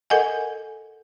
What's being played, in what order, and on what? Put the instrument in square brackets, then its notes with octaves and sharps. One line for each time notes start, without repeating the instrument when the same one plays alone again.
[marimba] A4 A#4 D#5 F#5 G#5